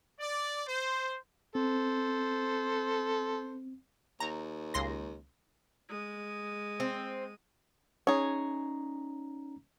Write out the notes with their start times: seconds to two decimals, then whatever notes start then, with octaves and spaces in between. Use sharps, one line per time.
0.19 D5
0.67 C5
1.55 C4 A4 C5
4.20 D#2 A#5
4.74 C#2 C6 A#6
5.89 G#3 D#6
6.80 C4
8.07 C#4 D#4 G#4 C#5 A#5